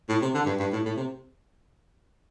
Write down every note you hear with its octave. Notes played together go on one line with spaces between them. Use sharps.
A2
C3
D3
G2
G2
A2
A2
C3